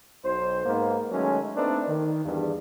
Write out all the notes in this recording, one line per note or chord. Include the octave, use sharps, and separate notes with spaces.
B1 C5
G#2 A#3 B3
D#3 F#3 G#3 A3 C#4
A3 A#3 C4 D4 D#4 B4
D#3
E2 G2